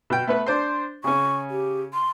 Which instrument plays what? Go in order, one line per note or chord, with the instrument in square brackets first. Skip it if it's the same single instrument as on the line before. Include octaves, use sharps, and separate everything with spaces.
[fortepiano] B2 G5
A3 B3 B4
D4 C5 C6
[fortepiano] C#3 C#4 [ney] C#6
[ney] G4
C6